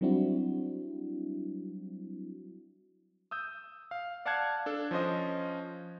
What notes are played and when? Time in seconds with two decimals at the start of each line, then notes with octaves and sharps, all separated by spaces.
0.01 F#3 G3 C4 D4 E4 F#4
3.31 D#6 E6 G6
3.91 F5
4.26 D5 F5 F#5 A5 F#6 G#6
4.66 D4 A4
4.91 F3 C#4 C5 D#5